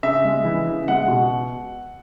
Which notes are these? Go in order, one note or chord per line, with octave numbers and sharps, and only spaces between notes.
C#3 E5
G#3
E3
C#3
G#3 F#5
B2